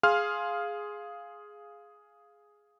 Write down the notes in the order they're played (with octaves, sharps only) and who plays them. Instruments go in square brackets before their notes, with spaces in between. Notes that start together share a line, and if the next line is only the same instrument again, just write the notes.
[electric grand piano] G#4 F5 C6 F6